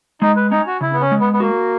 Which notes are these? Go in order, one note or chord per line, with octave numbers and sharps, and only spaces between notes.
G#3 D#4
B4
C#4 D#4
F#4
C#3 E4
B3
C#4
G#3
B3
B3
A#3 F#4